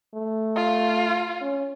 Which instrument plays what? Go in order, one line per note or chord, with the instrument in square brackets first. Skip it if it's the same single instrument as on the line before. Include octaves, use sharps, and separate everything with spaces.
[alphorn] A3
[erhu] F4
[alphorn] C#4